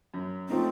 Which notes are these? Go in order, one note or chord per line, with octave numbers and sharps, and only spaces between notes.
F#2
F3 A3 C4 D#4